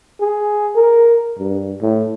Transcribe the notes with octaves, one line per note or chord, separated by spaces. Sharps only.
G#4
A#4
G2
A2